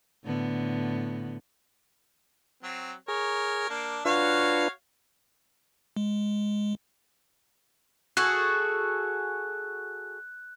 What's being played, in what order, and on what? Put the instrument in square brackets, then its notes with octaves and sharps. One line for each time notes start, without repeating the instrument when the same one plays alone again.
[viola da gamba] A2 D3 B3
[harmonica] F#3 C4
[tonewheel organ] G#4 [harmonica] A#4 C#5
[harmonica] A#3 D4
[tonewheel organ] D4 F4 B4 [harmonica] F#4 C#5 F5
[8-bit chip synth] G#3
[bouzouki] F#4 G#4 A4 [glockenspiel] F#6